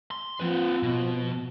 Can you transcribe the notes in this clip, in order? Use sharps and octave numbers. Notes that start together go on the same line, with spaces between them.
C6
F3 C4 B4
B2